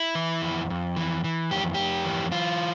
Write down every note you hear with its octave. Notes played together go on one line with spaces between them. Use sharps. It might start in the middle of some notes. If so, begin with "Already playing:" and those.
Already playing: E4
E3
F2
F2
E3
E3
F2 G4
F2 G4
E3
E3 F4